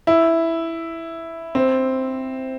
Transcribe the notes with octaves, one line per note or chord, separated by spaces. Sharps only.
E4
C4